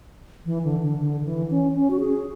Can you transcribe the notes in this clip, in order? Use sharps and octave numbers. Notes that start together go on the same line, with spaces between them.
E3
D3
D3
D3
D3
E3
C#4
C#4
F#4
G#4